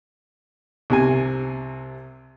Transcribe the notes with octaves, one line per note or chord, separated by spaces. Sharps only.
C2 C3 G#5